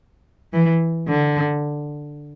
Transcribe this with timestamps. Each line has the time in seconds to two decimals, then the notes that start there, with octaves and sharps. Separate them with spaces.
0.53 E3
1.08 D3